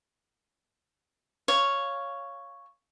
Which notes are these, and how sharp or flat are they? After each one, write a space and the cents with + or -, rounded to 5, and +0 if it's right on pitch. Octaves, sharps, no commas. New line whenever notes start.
C#5 +0 F5 +0